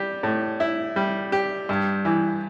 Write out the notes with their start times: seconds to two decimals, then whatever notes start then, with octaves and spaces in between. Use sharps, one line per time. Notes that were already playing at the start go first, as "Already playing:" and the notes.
Already playing: G3 G4
0.23 A2
0.60 E4
0.96 G3
1.32 G4
1.69 G2
2.05 E3